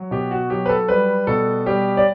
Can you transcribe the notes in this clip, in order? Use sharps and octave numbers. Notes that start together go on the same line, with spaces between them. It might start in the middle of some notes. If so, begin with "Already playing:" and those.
Already playing: F#3
B2 G4
F#4
F#3 G4
B4
A4
G3 B4
B2 A4
G3 G4
D5